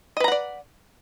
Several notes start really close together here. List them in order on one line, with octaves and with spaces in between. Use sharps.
D#5 B4 A#5 F#5 D5